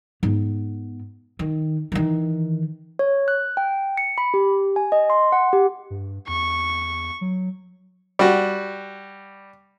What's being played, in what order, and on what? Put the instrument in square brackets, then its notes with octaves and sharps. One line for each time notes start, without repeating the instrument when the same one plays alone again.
[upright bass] G#2 B3
D#3
D#3 E3
[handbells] C#5
F#6
G5
C#7
B5
G4
G#5
D#5
C6
F#5
G4
[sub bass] G2
[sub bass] E2 [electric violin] C#6
[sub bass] F#3
[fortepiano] G3 F#4